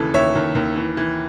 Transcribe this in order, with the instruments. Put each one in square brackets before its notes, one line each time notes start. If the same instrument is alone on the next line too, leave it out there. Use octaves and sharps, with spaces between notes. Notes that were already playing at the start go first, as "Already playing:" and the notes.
Already playing: [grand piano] D#2 C#3 E3 A4
D#2 C#5 E5
D#2
D#2
E3
E3